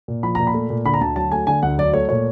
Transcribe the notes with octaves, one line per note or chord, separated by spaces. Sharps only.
A#2
F3 B5
A#2 A#5
B5
A3
A#2
D3 B5
A#5
D2 A5
F#3 A5
A3 G#5
D3 G#5
D2 F#5
F#3 D5
A3 C#5
A#2 C#5